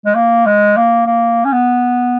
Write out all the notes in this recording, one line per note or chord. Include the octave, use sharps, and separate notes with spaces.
G#3
A#3
G#3
A#3
A#3
C#4
B3